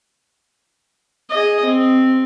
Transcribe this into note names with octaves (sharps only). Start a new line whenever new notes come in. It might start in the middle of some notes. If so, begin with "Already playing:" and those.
G#4 D#5
C4